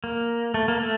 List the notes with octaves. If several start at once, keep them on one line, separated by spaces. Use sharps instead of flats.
A#3
A3
A#3
A3